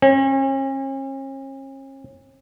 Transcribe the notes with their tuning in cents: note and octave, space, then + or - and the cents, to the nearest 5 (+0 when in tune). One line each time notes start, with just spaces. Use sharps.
C#4 -40